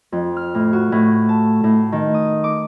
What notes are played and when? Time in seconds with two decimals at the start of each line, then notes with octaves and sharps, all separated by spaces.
0.12 F2
0.37 F6
0.54 A2
0.73 F#4
0.92 A2
1.29 A5
1.64 A2
1.92 D#3
2.14 D#6
2.44 D6